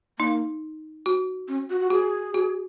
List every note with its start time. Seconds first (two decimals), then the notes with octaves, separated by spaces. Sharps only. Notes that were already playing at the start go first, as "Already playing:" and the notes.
0.19 A#3 D#4
1.06 F#4
1.48 C#4
1.70 F#4
1.80 F#4
1.90 F#4 G#4
2.34 F#4